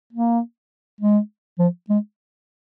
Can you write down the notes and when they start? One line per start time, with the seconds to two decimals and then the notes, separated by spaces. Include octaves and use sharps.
0.13 A#3
1.01 G#3
1.59 F3
1.89 G#3